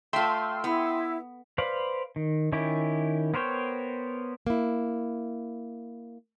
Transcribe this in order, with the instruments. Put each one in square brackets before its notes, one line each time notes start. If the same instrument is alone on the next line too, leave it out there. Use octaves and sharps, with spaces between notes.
[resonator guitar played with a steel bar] A3 F4 [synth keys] G5 C6 E6
[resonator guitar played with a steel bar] B3 [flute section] E4
[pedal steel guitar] B4 C5 D5 F5 B5
D#3
D#3 C#4 E4 G4
B3 A#4 C5 C#5 G5
[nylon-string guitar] A#3 E4